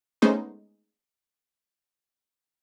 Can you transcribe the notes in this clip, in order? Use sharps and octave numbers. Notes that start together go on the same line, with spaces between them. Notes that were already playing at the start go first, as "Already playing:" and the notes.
G#3 A3 B3 C#4 D#4 C5